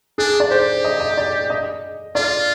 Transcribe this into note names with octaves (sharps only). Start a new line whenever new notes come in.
D4 G#4
D5
G4 C5
D#5
D#5
D5
D#5
F4 D5